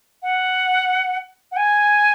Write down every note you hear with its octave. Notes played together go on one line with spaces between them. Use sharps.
F#5
F#5
G#5